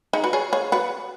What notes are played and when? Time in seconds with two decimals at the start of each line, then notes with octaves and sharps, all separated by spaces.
0.13 D#4 G#4
0.24 F#4 B4
0.33 G#4 C#5
0.53 G#4 C#5
0.72 F#4 B4